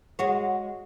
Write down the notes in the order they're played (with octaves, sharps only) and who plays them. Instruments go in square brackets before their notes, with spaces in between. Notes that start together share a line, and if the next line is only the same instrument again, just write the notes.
[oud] G#3 F#4 C#5